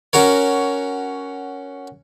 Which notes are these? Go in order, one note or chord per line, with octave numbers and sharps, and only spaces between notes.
C#4 F#4 A#4 C#5